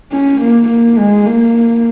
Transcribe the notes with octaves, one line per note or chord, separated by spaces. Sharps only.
C#4
A#3
A#3
G#3
A#3